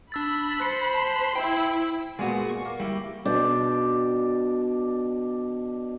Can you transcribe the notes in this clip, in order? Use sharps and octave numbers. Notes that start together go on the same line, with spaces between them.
D4 B5 E6 A6
C5 F#6 C#7
A5
E4 G5 B5
A#2 G#3 B3 F#4
C#6
A#3
G3 E4 G4
B2 D4 D5 G5